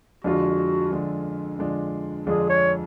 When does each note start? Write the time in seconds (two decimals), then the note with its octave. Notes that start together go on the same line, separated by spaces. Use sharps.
0.24 F2 D3 G#3 D4 F4 F#4
0.91 F2 D3 G#3 D4 F4
1.59 F2 D3 G#3 D4 F4
2.27 F2 D3 G#3 D4 F4 G#4
2.49 C#5